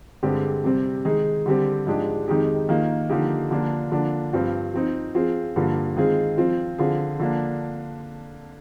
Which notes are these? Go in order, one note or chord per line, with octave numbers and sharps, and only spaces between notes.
G2 D3 G#3 C4 G4
C3 G3 C4
D#3 G#3 D#4 G#4
D3 G3 C4 G4
G#2 F3 G#3 D4 G4
F2 D#3 G#3 D#4 G4
D#3 A#3 F4
D3 F3 A#3 D#4 G4
D3 F3 A#3 D4 F4
D3 F3 A#3 D4
G2 F3 C4 F4
F3 C4 D#4
F3 C4 F4 G#4
G2 D3 F3 A#3
D#3 G#3 C4 F4 G#4
F3 C4 F4
D3 F3 C4 F4 G#4
D3 F3 A#3 D4